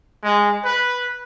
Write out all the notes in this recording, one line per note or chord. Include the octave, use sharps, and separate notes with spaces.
G#3
B4